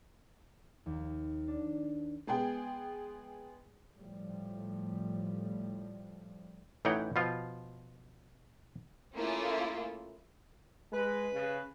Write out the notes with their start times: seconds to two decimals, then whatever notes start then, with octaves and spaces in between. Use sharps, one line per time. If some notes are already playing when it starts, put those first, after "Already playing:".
0.86 D#2
1.47 D4
2.27 G#3 B3 G#4 G5
3.97 A2 F3 G3
6.85 A1 E3 D#4 C#5 F#5 G5
7.16 B2 F3 F4
9.14 A3 A#3 C#4 E4 F4 G#4
10.92 G#3 B4
11.33 C#3